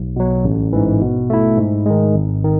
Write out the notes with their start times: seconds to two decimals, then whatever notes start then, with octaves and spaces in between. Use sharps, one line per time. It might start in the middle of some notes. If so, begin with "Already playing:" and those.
Already playing: B1
0.16 B2 F#3
0.44 A1
0.73 G#2 E3
1.01 B2
1.30 A3 E4
1.57 G#2
1.86 D#3 G#3
2.14 G#1
2.44 D#3